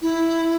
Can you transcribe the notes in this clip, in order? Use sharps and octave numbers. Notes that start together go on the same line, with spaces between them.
E4